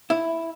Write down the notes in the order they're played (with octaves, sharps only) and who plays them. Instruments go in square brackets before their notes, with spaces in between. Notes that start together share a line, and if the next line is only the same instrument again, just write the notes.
[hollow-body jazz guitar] E4